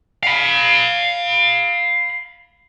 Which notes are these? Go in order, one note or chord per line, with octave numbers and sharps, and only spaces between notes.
F5 B5